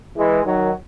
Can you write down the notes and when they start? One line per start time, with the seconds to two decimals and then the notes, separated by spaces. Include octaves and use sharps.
0.16 E3 G#3
0.44 D#3 F#3